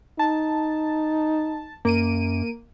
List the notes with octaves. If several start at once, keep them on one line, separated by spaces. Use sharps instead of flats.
D#4 A5
F#2 A#3 D7 D#7